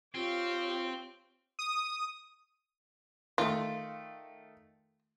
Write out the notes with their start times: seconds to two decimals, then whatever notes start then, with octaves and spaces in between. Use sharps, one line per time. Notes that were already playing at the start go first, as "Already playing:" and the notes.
0.15 C4 F4 G4 C#5 F5
1.59 D#6
3.38 D#3 A3 F4